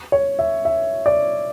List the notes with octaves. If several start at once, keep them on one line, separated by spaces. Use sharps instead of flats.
C#5
E5
E5
D5